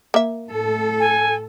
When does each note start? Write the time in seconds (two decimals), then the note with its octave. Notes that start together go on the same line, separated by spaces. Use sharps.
0.14 A#3 E5
0.47 A2 A4
1.00 G#5